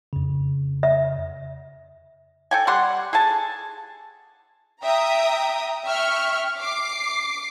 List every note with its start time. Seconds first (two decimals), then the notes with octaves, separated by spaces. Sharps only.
0.13 F2 C#3
0.83 E5
2.51 A4 G5 G#5
2.67 G3 G4 F#5 C6
3.13 G#4 A4 G#5 A5
4.83 E5 G5 A#5 D#6
5.87 E5 G5 C#6 F6
6.60 D6 C7